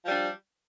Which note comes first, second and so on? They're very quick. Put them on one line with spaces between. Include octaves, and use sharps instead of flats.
F3 G3 D4